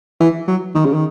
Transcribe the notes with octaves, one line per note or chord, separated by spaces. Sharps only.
E3
F#3
D#3
C#3
D#3